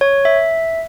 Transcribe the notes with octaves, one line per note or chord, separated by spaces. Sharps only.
C#5
E5